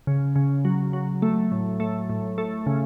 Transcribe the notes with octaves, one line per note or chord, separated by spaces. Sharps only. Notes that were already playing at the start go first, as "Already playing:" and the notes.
C#3
C#3
F#3
F#3
A3
A2
A3
A2
A3
C#3